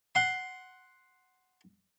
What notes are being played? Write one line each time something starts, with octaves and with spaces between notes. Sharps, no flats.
F#5 C6